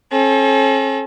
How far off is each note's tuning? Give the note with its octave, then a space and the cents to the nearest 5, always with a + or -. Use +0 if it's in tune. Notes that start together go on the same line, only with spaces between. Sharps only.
C#4 -45 A4 -35